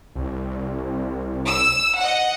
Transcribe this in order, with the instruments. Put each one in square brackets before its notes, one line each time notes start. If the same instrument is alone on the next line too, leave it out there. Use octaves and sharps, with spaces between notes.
[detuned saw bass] C2
[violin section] E6
D#5 F#5